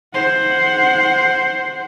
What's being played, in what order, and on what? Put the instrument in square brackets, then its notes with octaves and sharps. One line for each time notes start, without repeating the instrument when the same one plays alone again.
[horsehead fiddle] C5 F#5